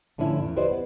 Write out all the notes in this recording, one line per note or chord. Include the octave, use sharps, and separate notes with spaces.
A2 D3 F3 C#4 E4
E2 D3
E4 G4 B4 C5 D5 D#5
B3